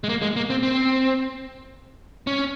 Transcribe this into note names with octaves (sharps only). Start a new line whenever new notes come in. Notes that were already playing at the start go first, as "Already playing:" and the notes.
G#3
A#3
G#3
A#3
C4
C4
C#4